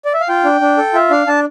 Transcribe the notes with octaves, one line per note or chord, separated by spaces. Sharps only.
D5
E5
F5
F4 G5
D4
D4
A4
F4 E5
D4 F5
D4 A5